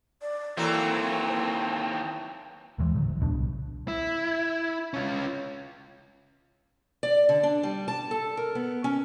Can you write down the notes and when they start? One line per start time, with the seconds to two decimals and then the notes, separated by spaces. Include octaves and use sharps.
0.22 D5
0.57 D#2 E3 F#3 A3 A#3 C4
2.78 D#2 D#3 E3 G#3
2.94 A2 D3 F#3
3.07 A1
3.20 D#1 C#2 B2 D4
3.34 C2
3.88 E4
4.94 C#4 F4
7.03 D5
7.29 D3
7.43 D4
7.63 G3
7.88 A5
8.11 A4
8.37 A#4
8.55 B3
8.84 C#4